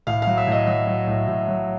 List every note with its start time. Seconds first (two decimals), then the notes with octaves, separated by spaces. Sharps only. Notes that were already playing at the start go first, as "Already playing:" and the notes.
0.07 A2 F5
0.22 F#3 F5
0.37 E5
0.47 A2 D#5
0.67 F#3 E5
0.87 F#3
1.07 A2
1.28 A2
1.48 F#3